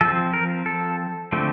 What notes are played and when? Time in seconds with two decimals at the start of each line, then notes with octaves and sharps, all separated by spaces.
0.01 F3 C4 A4
0.34 A#4
0.66 A4
1.32 D3 F3 A3 C4